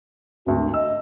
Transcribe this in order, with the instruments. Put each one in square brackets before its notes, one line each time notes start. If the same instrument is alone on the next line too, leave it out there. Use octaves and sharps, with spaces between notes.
[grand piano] G#1 D2 [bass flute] F#4
[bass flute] D4
[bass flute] D#5 [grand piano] E6